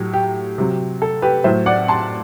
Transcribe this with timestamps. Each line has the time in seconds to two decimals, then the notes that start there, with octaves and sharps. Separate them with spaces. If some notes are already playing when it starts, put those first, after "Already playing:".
Already playing: A2 F#3 G4
0.13 G4
0.58 C3 F#3
1.02 A4
1.22 G4 B4
1.44 A2 F#3 C5 E5
1.66 D5 F#5
1.88 A5 C6